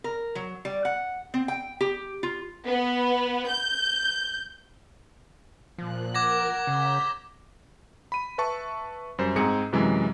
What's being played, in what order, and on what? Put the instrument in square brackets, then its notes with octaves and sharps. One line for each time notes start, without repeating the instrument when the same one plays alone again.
[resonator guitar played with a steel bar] A#4
F#3
G3
F#5
C4
G5
G4
F4
[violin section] B3
G6
[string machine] A#2 F#6 [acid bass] F3
[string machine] A#4 [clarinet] F#5 [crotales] D6 G#6 A#6
[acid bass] C#3 [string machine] A#5 G6 B6
[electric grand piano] B5 D#7
B4 E5 A5 C#6
F#2 G3 C5
G#2 C4 G#4 A#5 C#7
F#2 C3 E3 F#3 G#3